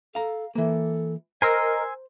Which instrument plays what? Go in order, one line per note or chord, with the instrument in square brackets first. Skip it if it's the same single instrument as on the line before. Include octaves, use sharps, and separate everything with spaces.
[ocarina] A4 [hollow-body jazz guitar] F5 A#5
[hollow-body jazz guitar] E3 A#3 [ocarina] A4
[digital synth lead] A#4 [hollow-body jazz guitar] C5 [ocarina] D#5 [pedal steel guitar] G#5 C6 E6